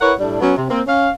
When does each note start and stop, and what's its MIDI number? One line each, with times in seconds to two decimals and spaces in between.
0.01 0.13 64
0.01 0.13 70
0.01 0.13 71
0.01 0.13 73
0.01 0.13 78
0.19 0.39 45
0.19 0.39 55
0.19 0.39 57
0.19 0.39 62
0.41 0.55 54
0.41 0.55 59
0.41 0.55 61
0.57 0.67 48
0.70 0.81 58
0.70 0.81 60
0.87 1.10 61
0.87 1.10 77